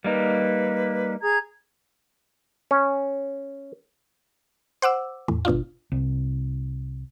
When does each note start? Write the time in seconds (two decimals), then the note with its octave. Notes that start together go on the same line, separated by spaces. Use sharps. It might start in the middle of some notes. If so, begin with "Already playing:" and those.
0.04 G3 A#3 D#4 B4
1.22 G#4 A#5 G#6
2.71 C#4
4.82 C5 F#5 D6 E6
5.28 E2 A2
5.45 G#1 B2 D4 F4
5.92 C2